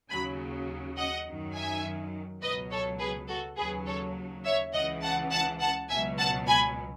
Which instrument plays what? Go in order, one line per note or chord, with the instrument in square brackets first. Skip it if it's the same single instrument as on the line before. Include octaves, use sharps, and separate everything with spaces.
[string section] D#2 C#3 F#3 G#5 B5
D#5 F#5
F#2 D#3 F#3
E5 G#5
C#2 B2 F#3 B4 D#5
A4 C#5
G#4 B4
F#4 A4
D#2 C#3 F#3 G#4 B4
A4 C#5
C#5 E5
C#2 C#3 E3 D#5 F#5
F#5 A5
F#5 A5
F#5 A5
C#2 B2 F#3 E5 G#5
F#5 A5
G#5 B5